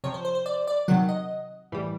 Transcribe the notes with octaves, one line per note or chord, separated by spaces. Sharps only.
C3 F3 C#5
C5
C5
C5
D5
D5
C3 D#3 F#3 F#5
D#5
A2 E3 G3